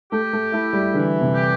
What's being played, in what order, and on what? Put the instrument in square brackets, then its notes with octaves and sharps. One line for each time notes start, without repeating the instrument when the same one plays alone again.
[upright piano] A3 [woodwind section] G4
[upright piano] A3
[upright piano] A3 [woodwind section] E4
[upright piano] G3
[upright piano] D3 [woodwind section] E3
[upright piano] C3
[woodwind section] G4